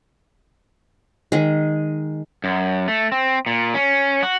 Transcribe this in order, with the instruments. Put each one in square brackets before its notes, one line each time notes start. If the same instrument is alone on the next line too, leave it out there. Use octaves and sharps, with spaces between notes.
[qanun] D#3 G#3
[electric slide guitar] F#2
A3
C4
A#2
C#4
F#4